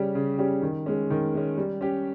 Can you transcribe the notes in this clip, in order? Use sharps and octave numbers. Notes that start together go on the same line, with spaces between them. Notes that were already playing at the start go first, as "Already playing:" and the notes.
Already playing: C#3 G3 C#4 G4
C#3
G3 C#4 G4
D#3
G#3 C#4
D#3
G#3 C#4
G3
C#4 G4